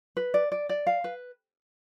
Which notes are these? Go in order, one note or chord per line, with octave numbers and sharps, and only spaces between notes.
B4
D5
D5
D5
F5
B4